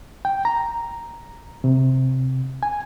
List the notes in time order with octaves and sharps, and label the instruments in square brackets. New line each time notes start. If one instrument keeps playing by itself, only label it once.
[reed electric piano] G5
A#5
C3
G#5